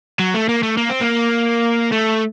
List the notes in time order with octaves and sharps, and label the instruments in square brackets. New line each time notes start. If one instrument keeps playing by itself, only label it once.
[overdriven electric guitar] F#3
A3
A#3
A3
A#3
C4
A#3
A3